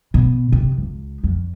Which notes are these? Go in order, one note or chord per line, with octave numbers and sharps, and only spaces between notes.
B2
C3
C#2
F2